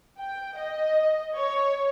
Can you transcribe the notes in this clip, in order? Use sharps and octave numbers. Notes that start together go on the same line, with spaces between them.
G5
D#5
C#5